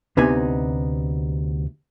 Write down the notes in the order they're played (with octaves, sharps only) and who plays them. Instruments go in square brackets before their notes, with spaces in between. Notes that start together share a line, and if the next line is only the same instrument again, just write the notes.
[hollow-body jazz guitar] D2 C3 B3 D#4 G#5